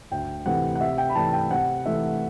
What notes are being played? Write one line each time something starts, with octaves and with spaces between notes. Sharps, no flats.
D2 G5
C3 E3 A3 F#5
F#5
C3 E5
G5
B5
E3 A3 D4 A5
G5
C3 F#5
E3 A3 E5